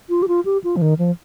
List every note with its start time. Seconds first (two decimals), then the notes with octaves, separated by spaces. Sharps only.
0.09 F4
0.22 G4
0.28 F4
0.45 G4
0.64 F4
0.76 F3
0.82 D#3
0.99 F3